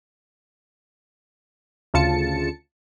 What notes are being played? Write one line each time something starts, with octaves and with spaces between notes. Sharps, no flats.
D2 C#3 F4 A5 C#7